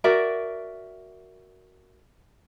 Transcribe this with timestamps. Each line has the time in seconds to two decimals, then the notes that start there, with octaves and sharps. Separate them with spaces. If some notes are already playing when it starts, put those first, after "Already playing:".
0.04 F#4 A#4 D5 E5